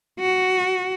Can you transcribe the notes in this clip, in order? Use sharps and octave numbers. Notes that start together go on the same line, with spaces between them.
F#4